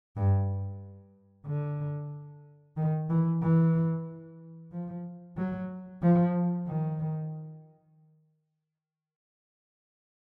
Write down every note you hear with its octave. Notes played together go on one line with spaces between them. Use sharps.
G2
D3
D#3
E3
E3
F3
F#3
F3
D#3